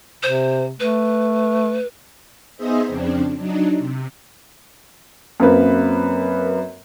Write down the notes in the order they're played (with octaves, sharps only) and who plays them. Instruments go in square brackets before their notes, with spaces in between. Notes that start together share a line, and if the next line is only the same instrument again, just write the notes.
[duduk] C3 [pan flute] C5
[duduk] A3 [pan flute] B4
[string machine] B3 D#4 G#4 C5 D#5 E5
F2 C#3 C4 D4
F#3 D4 D#4
C3
[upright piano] F#2 A#3 C4 B4